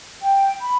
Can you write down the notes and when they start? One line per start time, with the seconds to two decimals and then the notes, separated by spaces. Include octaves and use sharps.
0.22 G5
0.61 B5